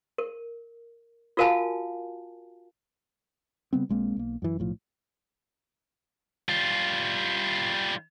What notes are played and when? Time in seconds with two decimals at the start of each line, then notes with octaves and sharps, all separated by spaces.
0.18 A#4
1.37 F4 F#4 A#4 F5 G#5 A5
3.73 C#3 G3 B3 C4
3.89 B1 G#3 A#3 C4
4.16 B1 A#3
4.42 F#2 E3
4.59 B1 A2 F3
6.49 G3 F4